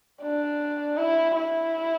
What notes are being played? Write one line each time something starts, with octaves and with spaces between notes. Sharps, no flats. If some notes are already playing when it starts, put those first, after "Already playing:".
D4
E4
E4